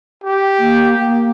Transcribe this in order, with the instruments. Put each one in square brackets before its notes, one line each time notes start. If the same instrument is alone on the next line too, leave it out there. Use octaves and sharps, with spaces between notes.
[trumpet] G4
[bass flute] A#3
A#3